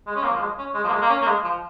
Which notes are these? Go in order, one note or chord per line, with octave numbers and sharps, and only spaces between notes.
G#3
C#4
A#3
F3
G#3
C#4
G#3
F3
A#3
G#3
A#3
C#4
A#3
G#3
F3